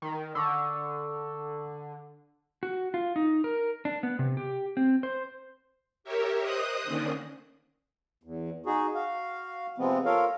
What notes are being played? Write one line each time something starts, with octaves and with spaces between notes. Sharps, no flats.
D#3
D3 C#6 D6 E6
F#4
F4
D#4
A#4
D4
B3
C3
G4
C4
C5
G4 A#4 C#5 E5
C5 D#5 D#6 F#6
D3 D#3 A#3 C#4 D4
E2
D#4 F#4 G#4
F#4 F5
C3 F3 G#3 B3 C4
F4 A4 A#4 C#5 F5